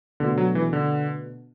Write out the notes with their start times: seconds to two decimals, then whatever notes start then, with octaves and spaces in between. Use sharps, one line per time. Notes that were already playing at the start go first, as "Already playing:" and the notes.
0.20 B2 D3 A3 D4 F#4
0.38 F#3
0.55 E3
0.73 D3